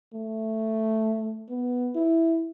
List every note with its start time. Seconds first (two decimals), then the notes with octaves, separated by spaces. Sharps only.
0.13 A3
1.49 B3
1.95 E4